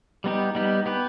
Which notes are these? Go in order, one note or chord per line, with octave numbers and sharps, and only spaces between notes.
G3 B3 D#4 G4
G3 B3 D#4 G4
B3 G4 B4